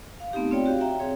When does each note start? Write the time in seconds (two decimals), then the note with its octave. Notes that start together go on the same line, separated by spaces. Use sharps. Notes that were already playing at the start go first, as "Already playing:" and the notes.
0.20 F5
0.33 A3 B3 C4 D#4 G4
0.51 C4 F4 C#5 D5 G5
0.66 F#4 G4 F5
0.81 E5 G5 A#5
0.99 C4 G#4 C#5